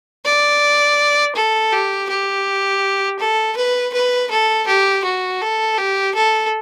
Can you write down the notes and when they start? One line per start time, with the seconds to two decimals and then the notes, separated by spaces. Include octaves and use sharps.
0.25 D5
1.35 A4
1.72 G4
2.09 G4
3.19 A4
3.56 B4
3.93 B4
4.30 A4
4.67 G4
5.04 F#4
5.41 A4
5.77 G4
6.14 A4